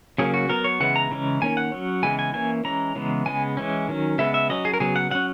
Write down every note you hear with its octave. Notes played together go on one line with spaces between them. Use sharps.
C#3 F#3 A#3 C#4 G#4
F#4
F#3 B3 A#4
C#5
C#3 E3 G#3 B3 F#5
A#5
C#3 E3 G#3 C#4
D#3 A#3 C#4 G#5
F#5
F#3 C#4
C#3 E3 G#3 B3 G#5
G#5
E3 A#3 C#4 G#5
E3 G#3 C#4 A#5
C#3 E3 G#3 B3
C#3 G#3 B3 G#5
E3 G#3 C#4
D#3 F#3 C#4
C#3 G#3 B3 E5
E5
F#3 C#4 D#5
G#4
A#4
C#3 F#3 B3 G#4
F#5
F#3 C#4 F#5